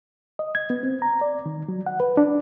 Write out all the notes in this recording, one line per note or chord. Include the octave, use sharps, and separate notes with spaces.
D#5
G#6
B3
C4
A#5
D5
D#3
F#3
F#5
B4
D4